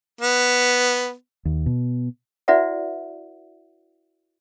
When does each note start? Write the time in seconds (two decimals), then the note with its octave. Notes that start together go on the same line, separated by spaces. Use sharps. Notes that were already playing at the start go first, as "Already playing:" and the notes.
0.21 B3
1.45 D#2
1.66 B2
2.48 E4 F#4 B4 D5 E5 F#5